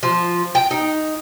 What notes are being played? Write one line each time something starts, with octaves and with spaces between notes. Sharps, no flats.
F3
G5
D#4